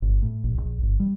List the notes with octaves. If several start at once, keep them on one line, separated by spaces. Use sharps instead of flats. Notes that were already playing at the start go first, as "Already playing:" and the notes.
G1
A2
A#1
A#1
G1
G3